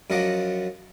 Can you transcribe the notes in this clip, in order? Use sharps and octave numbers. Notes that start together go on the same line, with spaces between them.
F#2 F3 F#3 D#5 F#5 D6